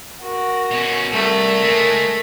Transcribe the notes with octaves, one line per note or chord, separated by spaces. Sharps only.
F#4 A#4
B2 C#4
C2 A3 A#4
C#2 G#3